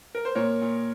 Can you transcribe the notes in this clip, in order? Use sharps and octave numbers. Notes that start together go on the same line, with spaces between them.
A#4
C5
A#2 A#4 C#5
A#2